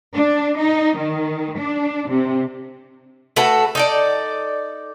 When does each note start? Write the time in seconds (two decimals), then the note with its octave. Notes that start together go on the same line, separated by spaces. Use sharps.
0.14 D4
0.57 D#4
0.97 D#3
1.57 D4
2.09 C3
3.36 A3 F#4 A4 B4
3.75 D#4 A4 D5